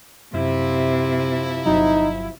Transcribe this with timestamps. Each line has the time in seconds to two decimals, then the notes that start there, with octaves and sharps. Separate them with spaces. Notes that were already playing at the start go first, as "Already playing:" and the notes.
0.34 F#2 C3 F3 E4
1.66 G1 F#3 D#4